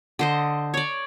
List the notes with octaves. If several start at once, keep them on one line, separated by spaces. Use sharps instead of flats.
D3 C5 D#5
C#5 D5